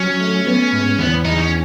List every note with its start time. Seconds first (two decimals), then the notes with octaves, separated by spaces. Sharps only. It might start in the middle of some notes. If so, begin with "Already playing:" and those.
Already playing: F#3 C#4
0.20 A3
0.46 B3
0.73 G#2
0.99 E2 B3
1.25 E2 D#4
1.38 C#4